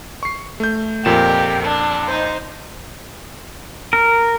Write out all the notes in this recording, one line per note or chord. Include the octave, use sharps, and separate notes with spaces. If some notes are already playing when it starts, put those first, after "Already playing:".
C#6 C7
A3 G6
F2 A#2 G4 A#4 E7
D4
D#4 C5
A#4